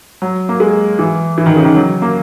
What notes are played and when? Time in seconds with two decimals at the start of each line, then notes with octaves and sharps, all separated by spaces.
0.22 F#3
0.49 A#3
0.60 G#3
0.99 E3
1.38 E3
1.46 D#3
1.56 C#3
1.65 D#3
1.76 F#3
2.02 A#3